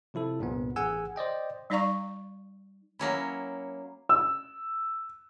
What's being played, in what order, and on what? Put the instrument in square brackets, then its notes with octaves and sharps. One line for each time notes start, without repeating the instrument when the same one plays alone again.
[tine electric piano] C3 F3 E4 A4
C2 G2 A#2 B3
A1 G#4 F#5 G#5 E6
C5 D5 D#5 G5
[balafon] G3 D#4 D5 F5 A#5 C#6
[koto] F#3 A#3 C#4 E4
[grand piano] E6